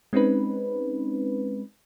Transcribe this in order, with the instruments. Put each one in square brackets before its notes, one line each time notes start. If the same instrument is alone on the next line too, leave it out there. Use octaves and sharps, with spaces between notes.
[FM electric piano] G#3 C4 C#4 D#4 B4